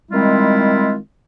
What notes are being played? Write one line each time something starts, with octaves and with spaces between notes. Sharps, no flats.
D#3 G3 G#3 C4 E4 F4